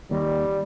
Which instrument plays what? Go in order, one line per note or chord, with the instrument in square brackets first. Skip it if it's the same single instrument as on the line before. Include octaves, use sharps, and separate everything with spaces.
[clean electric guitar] D#2 [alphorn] G3